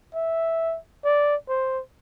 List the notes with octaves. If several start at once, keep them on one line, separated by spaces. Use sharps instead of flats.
E5
D5
C5